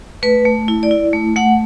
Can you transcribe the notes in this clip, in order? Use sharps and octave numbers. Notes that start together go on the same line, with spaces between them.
A3 B4
A3
E4
D5
E4
A3
A3 F#5